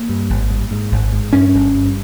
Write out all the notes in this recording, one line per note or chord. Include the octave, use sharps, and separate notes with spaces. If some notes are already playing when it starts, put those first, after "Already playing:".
Already playing: A#3
G2
G#1
G2
G#2
G#1
G#2
G2 C#4
G1
G2